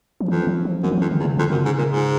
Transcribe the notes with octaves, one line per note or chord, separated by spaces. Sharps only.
F3
F2 E3
F3
F3
F#2 E3
F3
F2 E3
D3
E2
C#3
F2 D3
F#2 C#3
G#2
A#2
G#2